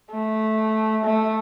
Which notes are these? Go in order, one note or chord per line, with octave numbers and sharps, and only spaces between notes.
A3
A3